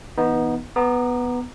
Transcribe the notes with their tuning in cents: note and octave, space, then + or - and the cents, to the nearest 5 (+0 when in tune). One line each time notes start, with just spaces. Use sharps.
E3 -30 B3 -10 D#4 +10
B3 +0 A#5 +0 D6 +40